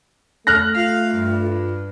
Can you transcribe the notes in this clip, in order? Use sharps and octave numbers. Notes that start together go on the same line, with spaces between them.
A3 F6 F#6 A#6
F4 F5
G2